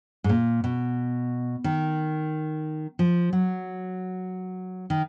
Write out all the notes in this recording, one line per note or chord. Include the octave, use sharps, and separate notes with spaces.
G#2
A#2
B2
D#3
F3
F#3
D#3